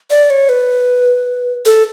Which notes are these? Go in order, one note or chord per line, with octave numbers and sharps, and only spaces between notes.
D5
C#5
B4
A4